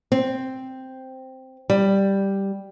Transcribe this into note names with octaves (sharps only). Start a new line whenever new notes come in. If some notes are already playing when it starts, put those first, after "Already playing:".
C4
G3